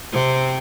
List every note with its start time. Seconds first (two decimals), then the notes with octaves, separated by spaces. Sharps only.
0.12 C3 C4